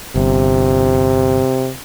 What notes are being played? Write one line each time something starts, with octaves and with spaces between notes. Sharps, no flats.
G1 C3